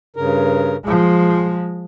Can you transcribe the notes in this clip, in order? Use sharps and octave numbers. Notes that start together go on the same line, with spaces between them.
G2 C#3 A#4
F3 G#3 G#4